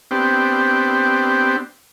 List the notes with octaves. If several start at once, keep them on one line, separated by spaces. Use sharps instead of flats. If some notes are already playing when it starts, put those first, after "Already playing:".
B3 C4 D4 G4